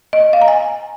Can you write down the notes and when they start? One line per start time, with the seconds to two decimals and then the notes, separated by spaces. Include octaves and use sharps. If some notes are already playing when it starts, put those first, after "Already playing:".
0.13 D#5
0.33 F5
0.42 A#5
0.48 G#5